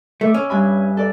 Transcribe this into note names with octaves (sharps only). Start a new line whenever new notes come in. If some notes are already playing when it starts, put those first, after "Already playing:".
A3 E5 D6
C#4
G2 G#5 B5
A4 D5